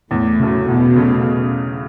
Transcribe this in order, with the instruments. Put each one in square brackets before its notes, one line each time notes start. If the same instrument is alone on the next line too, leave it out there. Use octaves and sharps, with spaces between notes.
[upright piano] E2 [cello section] A2
[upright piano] C#3 F#3 A3
[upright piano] E2 [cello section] B2
[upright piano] C#3 F#3 A3